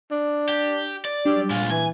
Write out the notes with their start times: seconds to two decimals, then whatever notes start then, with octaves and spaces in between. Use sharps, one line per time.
0.11 D4
0.49 G4
1.05 D5
1.25 F#3 G3 D4 G4
1.50 A#2 G#3 F4
1.70 E3 G#5